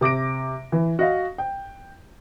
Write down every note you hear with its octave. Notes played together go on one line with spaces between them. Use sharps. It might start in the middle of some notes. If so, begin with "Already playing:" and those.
C3 D6 A#6 D7
E3
F#4 D#5 F5
G5